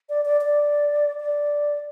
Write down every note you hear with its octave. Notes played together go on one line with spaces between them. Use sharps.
D5
D5
D5
D5